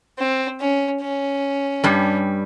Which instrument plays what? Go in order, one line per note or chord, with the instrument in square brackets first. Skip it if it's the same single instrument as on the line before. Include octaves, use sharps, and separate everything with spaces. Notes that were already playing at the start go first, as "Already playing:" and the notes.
[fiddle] C4
C#4
C#4
[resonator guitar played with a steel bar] G2 G3